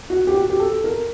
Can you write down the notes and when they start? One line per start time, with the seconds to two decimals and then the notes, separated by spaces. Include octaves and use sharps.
0.10 F#4
0.27 G4
0.34 F#4
0.50 G4
0.60 A4
0.84 A#4